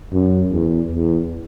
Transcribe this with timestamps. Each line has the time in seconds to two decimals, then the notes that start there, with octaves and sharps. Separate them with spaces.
0.13 F#2
0.52 E2
0.93 E2